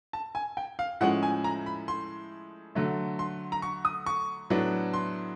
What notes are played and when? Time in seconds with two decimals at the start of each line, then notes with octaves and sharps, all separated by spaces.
0.13 A5
0.35 G#5
0.57 G5
0.79 F5
1.01 A2 F3 G#3 C#4 F#5
1.23 G#5
1.44 A#5
1.66 B5
1.88 C6
2.75 D3 F#3 A3
3.19 C6
3.52 A#5
3.62 C#6
3.85 D#6
4.06 C#6
4.50 A2 F#3 B3 D4
4.93 C6